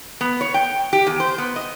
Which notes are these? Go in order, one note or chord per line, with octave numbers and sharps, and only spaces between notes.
B3
C#5
G5
G4
E2
C5
B3
D#5